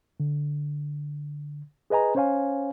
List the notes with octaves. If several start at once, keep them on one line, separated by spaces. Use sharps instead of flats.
D3
G#4 B4 D#5 G#5 A#5
C#4 C5 C#5 F5 G#5